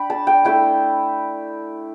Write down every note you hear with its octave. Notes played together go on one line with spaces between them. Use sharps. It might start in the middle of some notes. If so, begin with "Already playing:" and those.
Already playing: D4 G5 B5
A5
G5
A3 E4 G5